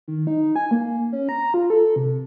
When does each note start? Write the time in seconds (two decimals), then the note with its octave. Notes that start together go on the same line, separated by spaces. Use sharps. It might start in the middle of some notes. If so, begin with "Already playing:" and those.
0.08 D#3
0.27 D#4
0.56 G#5
0.71 A#3
1.13 C#4
1.29 A#5
1.54 F4
1.70 A4
1.96 C3